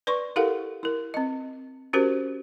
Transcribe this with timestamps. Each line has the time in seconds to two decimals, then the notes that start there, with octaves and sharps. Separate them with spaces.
0.07 B4 D5 C6 C#6
0.36 E4 G4 A4 A#4 F5 F#5
0.83 E4 A#4
1.14 C4 D#5
1.93 C#4 F#4 G4 A#4 C5